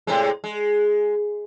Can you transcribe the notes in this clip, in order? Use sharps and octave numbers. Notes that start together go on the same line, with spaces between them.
A2 C3 G#3
G#3